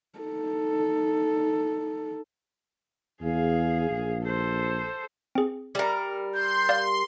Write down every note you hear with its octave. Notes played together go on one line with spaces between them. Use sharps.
D#4 A4
E2 G#4 F5
A#1
A4 C5
C4 G#4
G3 A#4
C6 G6
D5 F5